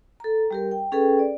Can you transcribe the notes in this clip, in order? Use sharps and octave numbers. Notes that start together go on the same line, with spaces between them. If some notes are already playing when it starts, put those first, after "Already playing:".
A4 A#5
G3 G4 A#4
G5
C#4 G#4 A4 B4 G5
D5